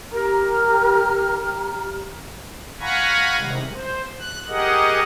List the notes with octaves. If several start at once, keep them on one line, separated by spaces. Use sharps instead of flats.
G4 A#4 A#5 F6
F5 F#5 G#5 A#5 B5 C#6
C3 D#3 G3 G#3
C5
F#6
G4 G#4 A#4 D#5 F#5